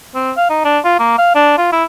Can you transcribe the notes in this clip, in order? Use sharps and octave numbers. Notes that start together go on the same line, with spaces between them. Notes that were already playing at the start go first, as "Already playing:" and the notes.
C4
F5
D#4
D4
F4
A#3
F5
D4
F4
E4